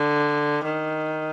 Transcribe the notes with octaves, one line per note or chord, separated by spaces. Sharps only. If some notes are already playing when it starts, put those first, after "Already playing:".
Already playing: D3
D#3